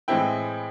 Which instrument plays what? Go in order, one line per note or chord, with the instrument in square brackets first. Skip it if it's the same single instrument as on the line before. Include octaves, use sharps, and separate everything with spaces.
[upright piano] A2 E3 G#3 C4 E4 G5